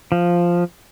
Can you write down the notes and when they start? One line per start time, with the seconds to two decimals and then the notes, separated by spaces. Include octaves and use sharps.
0.12 F3